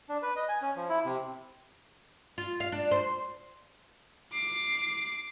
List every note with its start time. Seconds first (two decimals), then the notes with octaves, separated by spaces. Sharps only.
0.09 D4
0.23 B4
0.36 D#5
0.49 G#5
0.62 C#4
0.76 F3
0.89 E4
1.05 C3
2.38 F4
2.60 F5
2.72 D4
2.91 C5
4.33 D6 C7